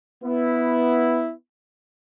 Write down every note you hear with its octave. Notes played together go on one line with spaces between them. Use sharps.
B3 E4